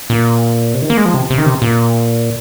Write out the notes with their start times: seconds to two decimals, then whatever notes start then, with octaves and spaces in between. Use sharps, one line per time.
0.10 A#2
0.74 C3
0.82 D#3
0.90 A#3
0.97 G#3
1.05 F3
1.14 C3
1.30 C3
1.38 D#3
1.46 C3
1.62 A#2